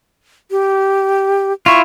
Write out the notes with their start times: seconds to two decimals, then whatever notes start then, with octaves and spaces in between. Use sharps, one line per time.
0.51 G4
1.66 E4 F4 C#6